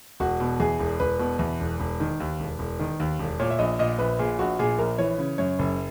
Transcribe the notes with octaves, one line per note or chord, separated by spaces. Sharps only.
E1 F#4
B2
E2 G#4
E1
E1 B4
B2
E2
E1
E1
D#3
D#2
E1
E1
D#3
D#2
E1
A#2 C#5
E5
A#1 D#5
A#2 D#5
A#1 B4
A#2 G#4
A#1 F#4
A#2 G#4
A#1 A#4
E3 C#5
C#3
F#2 C#5
F#1